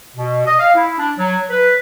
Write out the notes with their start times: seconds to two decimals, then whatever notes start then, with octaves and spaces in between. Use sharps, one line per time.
0.16 B2
0.45 D#5
0.60 F5
0.75 E4
0.98 D4
1.17 F#3
1.50 B4